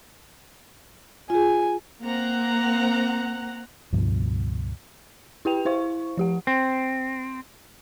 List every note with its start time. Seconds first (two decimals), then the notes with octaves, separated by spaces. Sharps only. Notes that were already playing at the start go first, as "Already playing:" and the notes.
1.30 F4 G#4 G#5
2.02 A#3 C4 F#5 A#5
3.93 C#2 G2 B2 F3
5.45 E4 G4 B4 G5 F7
5.65 E4 C5 F5 C#6
6.17 F3 G4 F#5
6.47 C4